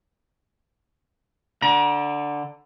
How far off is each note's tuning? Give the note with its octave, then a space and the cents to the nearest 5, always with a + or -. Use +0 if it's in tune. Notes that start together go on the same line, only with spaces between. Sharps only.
D3 +0 A#5 +40